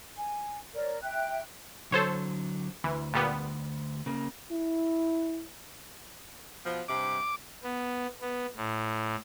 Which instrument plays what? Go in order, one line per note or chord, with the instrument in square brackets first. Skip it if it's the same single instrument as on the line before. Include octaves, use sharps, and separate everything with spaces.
[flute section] G#5
A#4 C#5 D5
E5 G5 F#6
[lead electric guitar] D3 F#3 [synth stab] A4 C5 C#5
[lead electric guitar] D2 [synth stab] E3
[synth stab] A#2 G3 B3
[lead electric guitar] C#3 A#3
[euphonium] E4
[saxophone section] B2 F3
[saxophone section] G2 C3 [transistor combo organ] D6
[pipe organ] B3
B3
A2